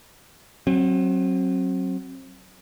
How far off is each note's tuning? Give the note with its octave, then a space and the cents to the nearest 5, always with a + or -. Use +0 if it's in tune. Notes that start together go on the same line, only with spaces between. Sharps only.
F#3 +15 C4 +35